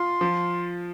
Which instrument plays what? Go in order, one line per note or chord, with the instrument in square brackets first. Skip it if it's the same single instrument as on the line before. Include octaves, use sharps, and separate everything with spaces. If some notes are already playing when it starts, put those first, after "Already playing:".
Already playing: [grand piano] F4 [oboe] C6
[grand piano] F3